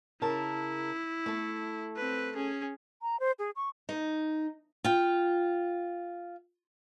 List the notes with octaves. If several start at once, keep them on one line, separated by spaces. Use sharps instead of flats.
C#3 E4 A#4 A5
A3 A4
C4 B4
C#4 G#4
A#5
C5
G#4
C#6
D#4
F4 G5